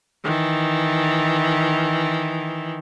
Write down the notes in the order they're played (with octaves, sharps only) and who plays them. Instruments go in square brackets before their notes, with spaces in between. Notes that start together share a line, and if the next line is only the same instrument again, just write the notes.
[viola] D#3 E3